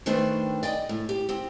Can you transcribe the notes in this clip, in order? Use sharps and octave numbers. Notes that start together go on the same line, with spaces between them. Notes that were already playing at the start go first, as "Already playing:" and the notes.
D#3 A3 D4 B4 C5 G5
D5 D#5 G5
A2
G4
C4 G4